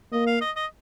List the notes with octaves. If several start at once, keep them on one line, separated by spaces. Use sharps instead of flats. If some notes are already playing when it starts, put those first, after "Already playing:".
A#3 D#5
F5
D#5
D#5